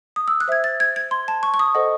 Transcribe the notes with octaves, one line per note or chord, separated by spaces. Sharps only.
D#6
E6
F#6
C5 E5 G#6
A6
G#6
G#6
C6
A5
C#6
C#6
D#6
A4 C5 D#5 F#5